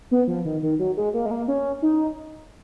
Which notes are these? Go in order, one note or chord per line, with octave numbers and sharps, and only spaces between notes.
B3
F3
D#3
D#3
F#3
G#3
A#3
G#3
A#3
C#4
D#4